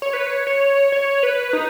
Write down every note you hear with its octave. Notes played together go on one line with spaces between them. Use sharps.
C#5
B4
C#5
C#5
C#5
B4
D#4